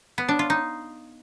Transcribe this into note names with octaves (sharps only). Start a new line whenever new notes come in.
B3
D4
F4
D#4